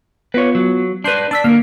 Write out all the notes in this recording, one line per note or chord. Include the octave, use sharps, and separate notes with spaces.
B3 F4 B4 C#5
F#3
D4 B4 C6 G6 C7
D4 A5 E6 B6
D3 A#3 A#4 F6